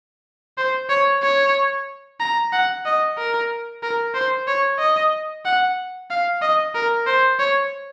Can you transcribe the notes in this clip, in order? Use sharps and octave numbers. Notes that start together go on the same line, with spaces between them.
C5
C#5
C#5
A#5
F#5
D#5
A#4
A#4
C5
C#5
D#5
F#5
F5
D#5
A#4
C5
C#5